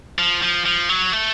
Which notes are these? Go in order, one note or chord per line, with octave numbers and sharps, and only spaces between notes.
F3
F3
F3
F#3
A3